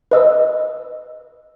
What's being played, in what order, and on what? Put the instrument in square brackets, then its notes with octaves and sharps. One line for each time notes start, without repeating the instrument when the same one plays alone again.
[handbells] B4 D#5 E6